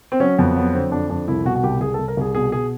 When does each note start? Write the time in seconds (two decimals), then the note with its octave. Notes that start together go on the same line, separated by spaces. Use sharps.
0.12 C4
0.20 F#3 C#4
0.38 F2 B3
0.56 F#3 B3
0.74 D3 C4
0.92 F2 D4
1.10 F2 D4
1.28 C2 E4
1.45 B2 F#4
1.55 F#4
1.63 C2 G4
1.81 C2 G#4
1.94 A4
1.99 C2
2.08 A#4
2.17 C2 G#4
2.35 B2 G#4
2.52 B2 G#4